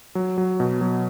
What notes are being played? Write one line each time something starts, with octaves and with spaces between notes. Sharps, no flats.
F#3
F#3
B2
F#3